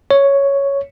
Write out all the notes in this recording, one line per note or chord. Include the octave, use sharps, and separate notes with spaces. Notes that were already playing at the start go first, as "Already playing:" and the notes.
C#5